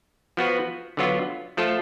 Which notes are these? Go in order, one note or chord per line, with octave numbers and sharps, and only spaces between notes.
F3 B3 F#4 B4
D3 F#3 B3 F4
F3 A3 F4 A4